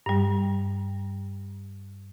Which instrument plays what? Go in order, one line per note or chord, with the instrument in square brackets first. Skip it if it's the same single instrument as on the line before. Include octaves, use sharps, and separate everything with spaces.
[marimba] G2 G3